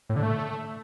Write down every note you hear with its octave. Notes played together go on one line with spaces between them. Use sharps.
A2
D3
A3